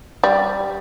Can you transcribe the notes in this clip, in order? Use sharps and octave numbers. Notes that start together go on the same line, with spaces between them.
G3